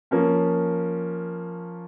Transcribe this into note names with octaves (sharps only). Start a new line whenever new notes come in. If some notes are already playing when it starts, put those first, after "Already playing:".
F3 A#3 C#4